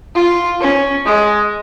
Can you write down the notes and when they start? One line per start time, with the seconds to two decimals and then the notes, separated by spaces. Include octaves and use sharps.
0.15 F4
0.60 C#4
1.05 G#3